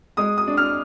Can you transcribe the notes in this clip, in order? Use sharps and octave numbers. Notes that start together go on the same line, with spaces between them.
G#3 D#6
D#6
D4
F6